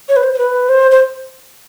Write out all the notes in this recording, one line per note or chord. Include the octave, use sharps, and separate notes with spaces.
C#5
B4
C5
C5
B4
C5
C5